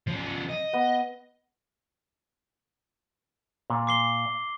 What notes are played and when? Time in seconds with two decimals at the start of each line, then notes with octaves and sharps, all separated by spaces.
0.07 F3 C#4
0.49 D#5
0.73 B3
3.70 A#2
3.87 D6 C7 G7